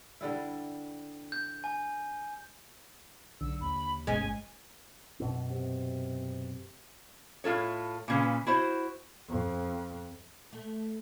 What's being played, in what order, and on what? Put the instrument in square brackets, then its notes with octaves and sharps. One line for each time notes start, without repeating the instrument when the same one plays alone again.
[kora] D3 G3 E4
[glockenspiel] G6
G#5
[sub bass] B1 [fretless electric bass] D3 [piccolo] E6
[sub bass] D#2 [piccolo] B5
[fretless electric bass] G1 [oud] G#3 C#4 [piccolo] G#5
[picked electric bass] F#2 B2 C4
[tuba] C3
[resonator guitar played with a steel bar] A2 F4 A4 C#5
A#2 C#3 B4
E4 F#4 C5
[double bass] F2
[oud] A3